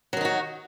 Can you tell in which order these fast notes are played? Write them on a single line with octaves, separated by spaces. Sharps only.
F#3 D#3 D#4 F#4